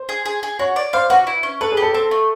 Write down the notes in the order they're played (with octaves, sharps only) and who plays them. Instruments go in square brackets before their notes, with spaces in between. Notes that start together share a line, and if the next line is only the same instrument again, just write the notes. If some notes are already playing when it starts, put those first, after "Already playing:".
Already playing: [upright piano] C5
[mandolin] G#4
G#4
G#4
[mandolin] F#4 [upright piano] C#5
[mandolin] D5
[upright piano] C5 [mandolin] F5
[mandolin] F#4 [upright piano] B4
[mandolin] E4
C#4
[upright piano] A4 [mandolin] B4
[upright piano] G#4
[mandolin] G4
[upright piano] A4
[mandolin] C4 [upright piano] A4
[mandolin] A3